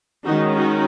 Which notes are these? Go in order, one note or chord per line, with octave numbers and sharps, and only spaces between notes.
D#3 G#3 C#4 D#4 F#4
D#4 F#4